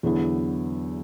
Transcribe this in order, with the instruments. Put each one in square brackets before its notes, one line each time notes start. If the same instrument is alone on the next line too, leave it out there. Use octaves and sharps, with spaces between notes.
[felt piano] E2 D3 F#3 B3 E4